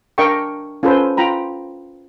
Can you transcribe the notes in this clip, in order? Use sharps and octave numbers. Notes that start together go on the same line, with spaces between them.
D4 A#4 D#5 F5 G5 C#6
C#4 F4 A4 B4 C5
F4 G5 A#5 B5